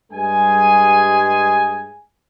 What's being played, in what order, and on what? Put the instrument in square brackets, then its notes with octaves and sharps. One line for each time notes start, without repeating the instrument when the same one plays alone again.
[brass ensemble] G2 G3 G#3 G#4 G#5